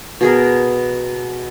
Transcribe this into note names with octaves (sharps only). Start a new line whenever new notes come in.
B2 G#4 A#4